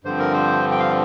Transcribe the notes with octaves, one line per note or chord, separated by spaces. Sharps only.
G2 D3 F3 C4 C5
A#4
C5
G5
F5